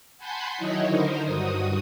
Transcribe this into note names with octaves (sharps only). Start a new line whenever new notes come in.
F#5 G#5 A5 B5 C6 G6
D#3 F#3 D#4 E4 C#5 D#5
D3 D#4 A#4 C5
G2 F#4 D#6